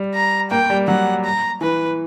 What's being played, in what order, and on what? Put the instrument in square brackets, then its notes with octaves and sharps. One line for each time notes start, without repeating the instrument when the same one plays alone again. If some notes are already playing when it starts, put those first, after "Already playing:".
Already playing: [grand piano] G3
[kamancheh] A#5
[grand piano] A#3 [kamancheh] G5
[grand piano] G3
[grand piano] F#3 [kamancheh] F#5
[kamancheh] A#5
[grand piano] E3 [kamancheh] B4